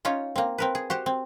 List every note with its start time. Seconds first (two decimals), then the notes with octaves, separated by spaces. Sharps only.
0.05 C#4 D#4 F4 C#5
0.36 A#3 C4
0.58 C4 A#4 B4
0.75 G#4
0.90 F#4 G4 C5
1.06 C4